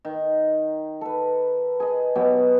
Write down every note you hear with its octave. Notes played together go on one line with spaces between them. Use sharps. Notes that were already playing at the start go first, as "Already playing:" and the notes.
D#3
A4 B4
G#4 D#5
B2 F#3 B3 G4